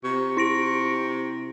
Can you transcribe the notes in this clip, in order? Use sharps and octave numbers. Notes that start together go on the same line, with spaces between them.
C3 F4 A#5 C#6
E4 A#6 D7